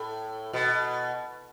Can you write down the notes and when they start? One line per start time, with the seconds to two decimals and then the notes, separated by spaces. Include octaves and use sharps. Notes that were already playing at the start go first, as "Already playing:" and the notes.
Already playing: A2
0.53 B2